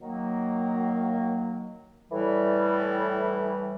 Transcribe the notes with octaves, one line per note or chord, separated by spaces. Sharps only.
D#3 F#3 A#3
A2 E3 G3